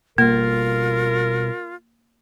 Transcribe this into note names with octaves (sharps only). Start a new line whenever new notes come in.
B2 G3 A#3 F4 A#4